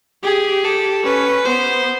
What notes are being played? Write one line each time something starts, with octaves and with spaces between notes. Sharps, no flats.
G4 G#4
G4 A4
C#4 B4
B3 C5